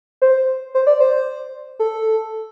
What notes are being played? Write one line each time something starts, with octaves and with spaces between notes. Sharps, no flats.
C5
C5
D5
C5
A4